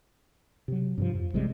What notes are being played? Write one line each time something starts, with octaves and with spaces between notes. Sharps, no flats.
C3 F#3
G2 C3 F3
F2
A1 C3 G3 G#3